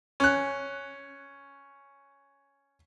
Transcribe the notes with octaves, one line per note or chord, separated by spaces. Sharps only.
C#4 F#6